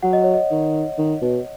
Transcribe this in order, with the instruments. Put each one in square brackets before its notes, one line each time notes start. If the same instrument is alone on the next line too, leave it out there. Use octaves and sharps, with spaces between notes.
[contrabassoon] F#3 [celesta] F#5
[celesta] D#5
C#5
D#5
[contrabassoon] D#3
D#3
B2